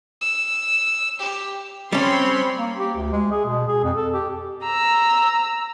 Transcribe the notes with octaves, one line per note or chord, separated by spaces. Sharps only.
E6
G4
G3 C4 C#4 C#5 B5 C6
A#3
G4
D2
G#3
G#4
B2
G#4
F2
A4
G4
A#5 E6